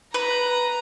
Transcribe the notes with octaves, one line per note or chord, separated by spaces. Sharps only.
B4 A#5